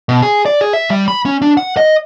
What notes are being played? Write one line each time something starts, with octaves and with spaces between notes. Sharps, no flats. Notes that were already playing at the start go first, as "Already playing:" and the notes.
B2
G#4
D5
G#4
E5
G3
B5
C#4
D4
F#5
D#5